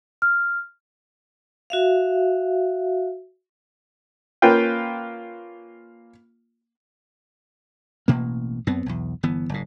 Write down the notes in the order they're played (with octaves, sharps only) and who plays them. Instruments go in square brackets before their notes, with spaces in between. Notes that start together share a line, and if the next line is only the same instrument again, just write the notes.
[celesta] F6
[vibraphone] F#4 E5 F5
[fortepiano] A#3 C#4 F4 B4 F5 G5
[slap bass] A1 B2 A#3
F#2 B3 C4
B1 E2
G1 E3 B3
F#1 G#2